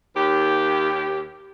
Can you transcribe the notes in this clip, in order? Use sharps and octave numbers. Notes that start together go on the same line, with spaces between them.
D#2 G4